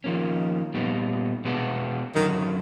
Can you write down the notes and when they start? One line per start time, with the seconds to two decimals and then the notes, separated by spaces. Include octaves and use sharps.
0.04 D#3 F3 A#3 C#4
0.74 A#2 G3 B3 D#4
1.45 B2 G#3 B3 D4 F#4
2.16 F#2 D3 D#3 F#3